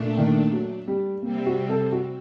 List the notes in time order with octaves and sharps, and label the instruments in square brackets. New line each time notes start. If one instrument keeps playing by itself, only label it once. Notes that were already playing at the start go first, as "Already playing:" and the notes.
Already playing: [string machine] A#2 A3 D4
[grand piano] D#3
F#3
G3
[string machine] C3 G3 C4 [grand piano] A#3
[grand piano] F#4
A4
F#4